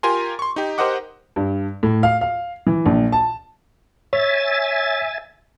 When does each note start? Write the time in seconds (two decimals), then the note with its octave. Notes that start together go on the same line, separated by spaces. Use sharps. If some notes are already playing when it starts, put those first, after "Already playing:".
0.03 F4 G4 A#4 G#5 A#5 C6
0.39 C6 C#6
0.56 D#4 G4
0.78 G4 A#4 C5 D#5 F#5 D6
1.36 G2
1.83 A2
2.03 F5
2.21 F5
2.67 E3
2.86 A#1
3.12 A5
4.13 C#5 E5 G#5 A6